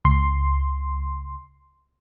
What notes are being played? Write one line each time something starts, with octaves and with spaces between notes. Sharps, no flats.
C#2 C6